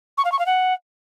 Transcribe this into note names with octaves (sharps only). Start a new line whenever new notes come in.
C#6
F5
C#6
F5
F#5